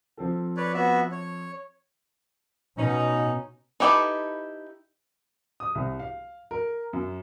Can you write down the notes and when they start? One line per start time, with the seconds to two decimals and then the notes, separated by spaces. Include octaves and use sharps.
0.17 F3 C4 A4
0.57 B4 C#5 D5
0.74 B3 F#4 E5
1.12 C#5
2.77 B2 C#4 D#4
3.80 D#4 E4 G4 A4 B4
5.60 D#6
5.75 C2
5.99 F5
6.51 A#4
6.93 F#2